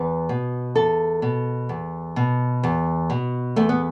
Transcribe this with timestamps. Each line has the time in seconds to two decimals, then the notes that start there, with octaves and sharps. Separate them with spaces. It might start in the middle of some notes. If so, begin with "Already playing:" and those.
Already playing: E2 B4
0.29 B2
0.75 E2 A4
1.22 B2
1.69 E2
2.16 B2
2.63 E2
3.10 B2
3.56 E2 A3
3.69 B3